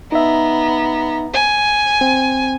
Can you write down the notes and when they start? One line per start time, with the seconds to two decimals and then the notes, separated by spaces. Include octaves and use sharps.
0.12 B3 D#4 E5 A#5
1.34 G#5
2.01 C4